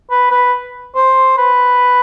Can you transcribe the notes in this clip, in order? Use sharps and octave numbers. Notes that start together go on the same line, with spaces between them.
B4
B4
C5
B4